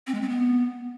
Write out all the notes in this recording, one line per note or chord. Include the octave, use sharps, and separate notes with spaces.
C4
G#3
C4
B3